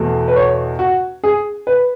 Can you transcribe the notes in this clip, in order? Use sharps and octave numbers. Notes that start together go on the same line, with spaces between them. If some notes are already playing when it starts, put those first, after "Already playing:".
Already playing: E2 B2 A3
B4
C#5
F#4
G#4
B4